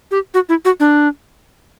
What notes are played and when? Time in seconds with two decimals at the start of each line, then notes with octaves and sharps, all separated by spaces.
0.11 G4
0.34 F#4
0.49 E4
0.65 F#4
0.80 D4